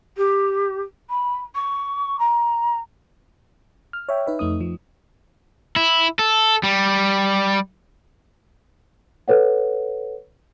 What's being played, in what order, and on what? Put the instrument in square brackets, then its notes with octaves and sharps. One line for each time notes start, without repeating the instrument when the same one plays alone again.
[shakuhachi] G4
B5
C#6
A#5
[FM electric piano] F6
C#5 E5 G5
D#4 B4 E5
F2 A3 D#4 D#6
F3
[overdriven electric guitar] E4
A4
G3
[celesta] A4 B4 C#5 F#5